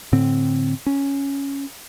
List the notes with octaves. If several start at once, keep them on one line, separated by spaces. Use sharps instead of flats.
A2 D3 C4
C#4